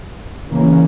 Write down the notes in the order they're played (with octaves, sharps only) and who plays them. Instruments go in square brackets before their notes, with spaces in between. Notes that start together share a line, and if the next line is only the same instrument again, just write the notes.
[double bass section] C#3 E3 A#3 C#4